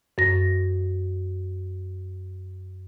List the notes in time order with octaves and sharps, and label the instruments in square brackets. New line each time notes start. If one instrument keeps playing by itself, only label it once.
[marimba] F#2 A#6